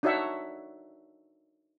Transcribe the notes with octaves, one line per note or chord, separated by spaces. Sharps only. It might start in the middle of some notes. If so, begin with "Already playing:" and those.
D4 D#4 F#4 C#5 E5 F#5